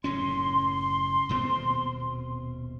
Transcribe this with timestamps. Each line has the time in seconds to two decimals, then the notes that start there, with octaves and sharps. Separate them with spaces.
0.04 F#1 A2 C#4 C6
1.29 D#1 B2 C4